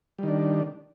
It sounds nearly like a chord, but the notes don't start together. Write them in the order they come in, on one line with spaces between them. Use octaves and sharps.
G3 D#3 D4